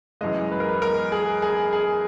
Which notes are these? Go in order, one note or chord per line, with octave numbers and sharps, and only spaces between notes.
F#2 E3 G#3 D#5
B4
A#4
B4
A#4
G#4
G#4
G#4